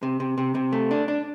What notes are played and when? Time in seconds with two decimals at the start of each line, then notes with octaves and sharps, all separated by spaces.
0.03 C3
0.20 C3
0.38 C3
0.55 C3
0.73 A3
0.91 D4
1.08 D4